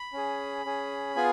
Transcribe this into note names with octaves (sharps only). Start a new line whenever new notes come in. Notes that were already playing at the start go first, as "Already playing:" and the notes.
Already playing: B5
C#4 G#4
C#4 G#4
B3 F4 G#4 G#5